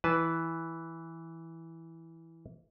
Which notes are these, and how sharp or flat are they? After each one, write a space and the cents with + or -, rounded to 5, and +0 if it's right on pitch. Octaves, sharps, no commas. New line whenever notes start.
E3 -5 B4 +0 A5 -25